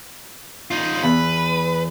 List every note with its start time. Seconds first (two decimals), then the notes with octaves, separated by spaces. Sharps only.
0.71 D#4 F4
1.03 E2 B4